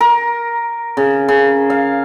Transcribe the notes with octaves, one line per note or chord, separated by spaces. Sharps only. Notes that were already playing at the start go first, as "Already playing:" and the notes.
A#4
C#3
C#3
F5